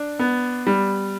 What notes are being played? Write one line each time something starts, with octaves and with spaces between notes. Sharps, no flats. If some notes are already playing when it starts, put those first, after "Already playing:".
Already playing: D4
B3
G3